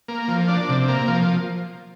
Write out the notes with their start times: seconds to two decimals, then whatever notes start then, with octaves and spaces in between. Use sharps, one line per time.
0.08 A#3
0.28 F3
0.48 D4
0.69 C3
0.88 A#3
1.08 F3